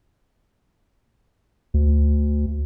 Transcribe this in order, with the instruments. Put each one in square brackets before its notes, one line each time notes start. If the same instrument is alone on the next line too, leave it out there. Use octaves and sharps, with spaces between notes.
[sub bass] D2